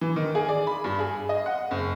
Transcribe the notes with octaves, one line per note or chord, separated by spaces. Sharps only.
E3
D#3
G#4
D5
B5
G2
G#4
D#5
F#5
F#1